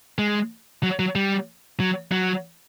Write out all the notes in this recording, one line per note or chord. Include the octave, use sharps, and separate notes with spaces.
G#3
F#3
F#3
G3
F#3
F#3